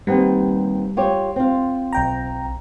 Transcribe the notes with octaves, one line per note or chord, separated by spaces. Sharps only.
D#2 G3 B3 C4
F4 G4 C#5
C4 F4
B1 G5 A#5